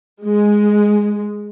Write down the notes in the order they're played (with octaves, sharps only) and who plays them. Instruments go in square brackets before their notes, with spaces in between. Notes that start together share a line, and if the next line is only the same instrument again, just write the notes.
[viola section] G#3